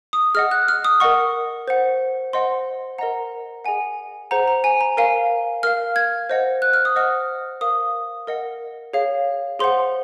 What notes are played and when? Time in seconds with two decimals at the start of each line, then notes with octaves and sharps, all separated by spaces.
0.13 D#6
0.35 G#4 D#5 F#5 F6
0.51 F#6
0.68 F6
0.85 D#6
1.00 A#4 D#5 F#5 C#6
1.68 C5 F#5
2.33 C5 D#5 F#5 C6
2.98 A#4 D#5 F#5 A#5
3.65 G#4 D#5 F#5 G#5
4.31 G#4 C5 F#5 A#5
4.48 A#5
4.64 G#5
4.81 A#5
4.97 A#4 F5 G#5
5.63 A#4 F5 F6
5.96 G#6
6.30 C5 D#5 F#5
6.62 F#6
6.73 F6
6.85 D#6
6.96 C5 D#5 F#5 F6
7.61 A#4 F5 D#6
8.27 A#4 D#5 F#5
8.93 G#4 C#5 F5
9.59 G#4 C5 F#5 C6